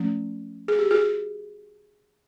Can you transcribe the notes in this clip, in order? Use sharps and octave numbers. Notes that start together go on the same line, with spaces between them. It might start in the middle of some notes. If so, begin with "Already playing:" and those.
Already playing: F3 A3 C#4
G#4
G4
F#4 G#4